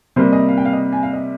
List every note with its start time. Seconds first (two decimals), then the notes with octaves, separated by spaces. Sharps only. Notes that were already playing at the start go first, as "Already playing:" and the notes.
0.16 C3 G3 A#3 C5
0.32 D#5
0.49 F5
0.58 G5
0.65 F5
0.73 D#5
0.92 G#5
1.03 F5
1.13 D#5